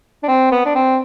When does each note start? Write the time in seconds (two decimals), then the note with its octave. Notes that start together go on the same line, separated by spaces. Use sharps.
0.23 D4
0.28 C4
0.52 B3
0.66 D4
0.75 C4